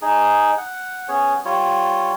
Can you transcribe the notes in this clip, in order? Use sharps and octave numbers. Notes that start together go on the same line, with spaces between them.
D#4 G#4
F#5
B3 C#4 G#4 C#5
G3 F4 C#5